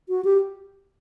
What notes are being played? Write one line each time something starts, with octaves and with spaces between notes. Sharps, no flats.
F#4
G4